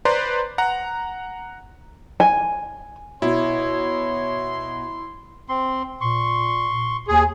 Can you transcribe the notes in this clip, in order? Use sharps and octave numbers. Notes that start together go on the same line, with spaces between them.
B4 C5 D5 A#5 C6
F#5 A#5
G#5
B2 E4 C#5 C6
C4 C6
A#2 C6 C#6
D#2 G#4